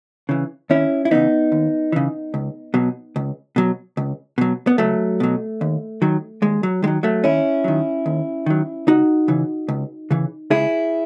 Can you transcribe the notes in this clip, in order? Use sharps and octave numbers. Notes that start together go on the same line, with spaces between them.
C#3 E3
D#2 C#4 E4
E4
C#3 E3 B3 D#4
D#2
C#3 E3
C#2
B2 F#3
C#2
B2 F#3
C#2
B2 F#3
B3
C#2 F#3 A3
B2 F#3
D#2
D#3 F#3
D#2 G#3
F#3
D#3 F#3 G#3
F#3 A3
D#2 C#4 E4
D#3 F#3
D#2
D#3 F#3
C#2 D#4 F#4
C#3 E3
C#2
C#3 E3
C#2 E4 G#4